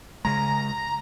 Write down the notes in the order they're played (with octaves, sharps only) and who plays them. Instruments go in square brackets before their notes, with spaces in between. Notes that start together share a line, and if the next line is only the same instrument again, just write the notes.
[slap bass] C#3 G#3 [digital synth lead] A#5